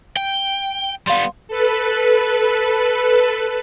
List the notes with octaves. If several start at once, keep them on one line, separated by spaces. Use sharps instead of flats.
G5
G3 B3 F5 C6
A4 B4